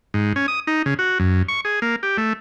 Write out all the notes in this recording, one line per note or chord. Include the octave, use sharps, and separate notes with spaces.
G#2
C#4
D#6
D#4
C#3
F#4
F#2
C#6
G#4
A#3
G4
A3